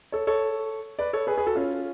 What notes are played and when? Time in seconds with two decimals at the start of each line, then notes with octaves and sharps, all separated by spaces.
0.12 A4 C#5
0.27 A4 C#5
0.99 B4 D5
1.13 A4 C#5
1.27 G#4 B4
1.37 G#4 B4
1.46 F#4 A4
1.55 C#4 F4